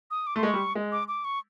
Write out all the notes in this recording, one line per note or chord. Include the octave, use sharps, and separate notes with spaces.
D#6
D6
A3 C6
G#3 C#6
G3
G#3
D6
D6
C#6